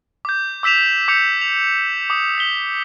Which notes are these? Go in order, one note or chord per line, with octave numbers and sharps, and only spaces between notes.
D6 G6
D6 E6 B6 E7 F7
D6 G6 C#7 F7
F7
D6 D#6
B6 G7